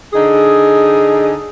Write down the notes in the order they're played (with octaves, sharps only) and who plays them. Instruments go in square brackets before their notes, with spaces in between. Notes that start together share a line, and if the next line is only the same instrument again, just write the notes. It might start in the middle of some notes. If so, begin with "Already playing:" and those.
[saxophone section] D3 D#4 G#4